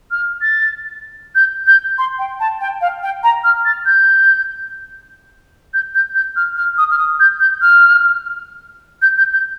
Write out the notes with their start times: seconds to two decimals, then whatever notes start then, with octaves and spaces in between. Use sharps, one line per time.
0.11 F6
0.42 A6
1.35 G6
1.67 G6
1.98 C6
2.19 G5
2.40 A5
2.61 G5
2.81 F5
3.03 G5
3.23 A#5
3.44 F6
3.65 A6
3.86 G6
5.74 G6
5.94 G6
6.15 G6
6.36 F6
6.57 F6
6.78 D#6
6.91 F6
6.98 D#6
7.20 G6
7.40 G6
7.61 F6
9.02 G6
9.18 G6
9.33 G6